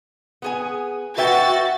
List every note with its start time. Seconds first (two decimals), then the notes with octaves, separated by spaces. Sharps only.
0.42 B3 G#4 G#5
1.18 F#4 B4 E5 G5 A6